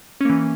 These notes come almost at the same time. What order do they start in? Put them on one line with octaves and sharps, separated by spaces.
C#4 A#3 E3